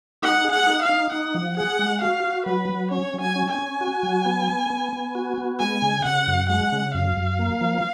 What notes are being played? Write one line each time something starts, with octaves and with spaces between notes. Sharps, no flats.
D#4 F#5
G#4
F#5
D#4
F5
D#4
D#4 F#5
F3
G#4 F#5
G#3
F#4 F5
F#4
F#3 B4
F#3
C#4 C#5
F#3
G#5
C#4
G#5
C#4
F#4
F#3
B3
B3
B3
B3
F#4
B3
G#3 G#5
C#3
C#3 F#5
F#2
G#3 F#5
C#3
F#2 F5
F#2
A#3
F3